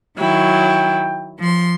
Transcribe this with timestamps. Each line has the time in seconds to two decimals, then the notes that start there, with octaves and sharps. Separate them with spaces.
0.19 D#3 F#3 E4 G5
1.39 F3 C6